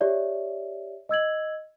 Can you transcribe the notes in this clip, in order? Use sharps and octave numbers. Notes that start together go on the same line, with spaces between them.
G4 C#5 D5 E5
D#5 E6 G#6 F#7